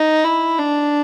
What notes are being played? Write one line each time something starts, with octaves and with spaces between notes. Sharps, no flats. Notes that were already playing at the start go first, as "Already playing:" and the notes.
Already playing: D#4
E4
D4